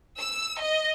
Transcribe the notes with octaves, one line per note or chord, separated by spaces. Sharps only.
E6
D#5